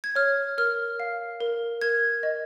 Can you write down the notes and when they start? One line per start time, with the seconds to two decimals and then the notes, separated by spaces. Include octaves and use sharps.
0.04 G#6
0.15 C#5 F6
0.58 A#4 F6
1.00 F5
1.41 A#4
1.81 A#4 G#6
2.23 D#5